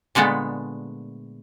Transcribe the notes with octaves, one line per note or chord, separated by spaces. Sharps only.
A#2 D3 G#3 A3 B3